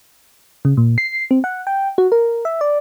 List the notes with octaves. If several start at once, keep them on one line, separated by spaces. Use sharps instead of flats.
C#3
A#2
C7
C4
F#5
G5
F#4
A#4
E5
D5